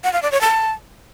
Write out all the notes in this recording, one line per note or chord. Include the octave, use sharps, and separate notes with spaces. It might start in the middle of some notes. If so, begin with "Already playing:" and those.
F#5
F5
D5
C#5
A5